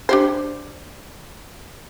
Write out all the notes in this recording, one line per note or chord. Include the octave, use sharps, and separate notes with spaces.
D4 G4 C5